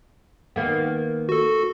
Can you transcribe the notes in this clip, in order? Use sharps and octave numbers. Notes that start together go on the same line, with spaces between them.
D#3 A#3 B3
F#4 A4